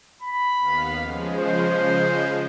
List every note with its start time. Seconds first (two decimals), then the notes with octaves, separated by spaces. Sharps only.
0.22 B5
0.59 D#2 B3 F5
0.96 C#3 F3 G#3
1.38 C5